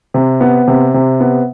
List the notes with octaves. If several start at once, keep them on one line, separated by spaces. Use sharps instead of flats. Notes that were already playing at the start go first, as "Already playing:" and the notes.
C3
B3
C3
C3
B3